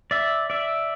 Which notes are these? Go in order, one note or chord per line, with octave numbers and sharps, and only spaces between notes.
D5 E5
D5 E5